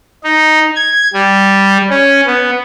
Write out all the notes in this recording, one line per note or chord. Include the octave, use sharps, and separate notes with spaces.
D#4
G#6
G3
C#4
B3